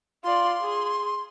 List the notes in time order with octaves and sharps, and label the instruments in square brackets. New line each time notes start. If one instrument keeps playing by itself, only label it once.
[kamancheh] F4 D5 [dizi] C6
[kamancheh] G#4